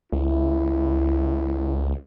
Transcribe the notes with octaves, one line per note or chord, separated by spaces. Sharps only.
C#2 E4